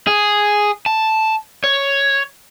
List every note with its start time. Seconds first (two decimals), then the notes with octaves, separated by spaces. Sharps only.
0.07 G#4
0.86 A5
1.64 C#5